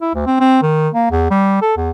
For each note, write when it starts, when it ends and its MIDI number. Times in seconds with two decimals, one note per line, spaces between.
0.01 0.13 64
0.15 0.26 38
0.27 0.39 60
0.40 0.60 60
0.62 0.89 51
0.94 1.07 58
1.11 1.27 40
1.31 1.61 55
1.62 1.76 69
1.77 1.91 40